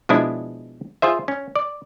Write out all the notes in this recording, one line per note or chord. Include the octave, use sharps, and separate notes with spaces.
B2 F3 G#3 D4 E4
F4 G#4 C5 E5
C#4
D5